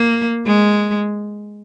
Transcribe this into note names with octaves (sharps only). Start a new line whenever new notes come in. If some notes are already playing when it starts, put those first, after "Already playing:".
Already playing: A#3
G#3